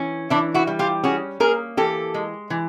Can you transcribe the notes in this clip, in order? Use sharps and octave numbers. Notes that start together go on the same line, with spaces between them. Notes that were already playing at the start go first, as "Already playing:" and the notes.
Already playing: E3 C#4
E3 D4 E4
E4 F#4
G3
F4 G4
C#4 F#4 G#4
A#3 G#4 A#4
E3 G4 A4
G#3
E3